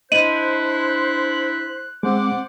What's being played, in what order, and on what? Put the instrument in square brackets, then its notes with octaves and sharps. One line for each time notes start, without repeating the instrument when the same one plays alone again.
[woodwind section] D4 E4 C5 [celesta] D#5 D#7 F#7 [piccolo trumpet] F#6
[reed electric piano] G#3 C4 [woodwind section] C5 F#5 D6